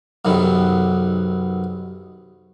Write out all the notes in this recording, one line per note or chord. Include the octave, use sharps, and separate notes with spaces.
B1 F#2 C3 D#3 B3